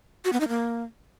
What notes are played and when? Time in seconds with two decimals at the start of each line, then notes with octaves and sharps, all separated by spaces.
0.25 F#4
0.33 B3
0.40 D#4
0.48 A#3